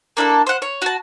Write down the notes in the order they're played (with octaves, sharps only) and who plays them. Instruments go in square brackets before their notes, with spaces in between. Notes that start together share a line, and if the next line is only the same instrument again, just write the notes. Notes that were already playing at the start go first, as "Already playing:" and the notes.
[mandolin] A#3 D4 E4 A4
C5 F#5
C#5
F#4 A5